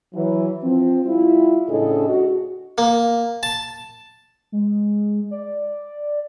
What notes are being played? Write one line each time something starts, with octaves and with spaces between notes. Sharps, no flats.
E3 F#3
F3 C4
G3 E4 F4
A2 C#3 D4 G#4 A4 D#5
F#4
A#3
A5
G#3
D5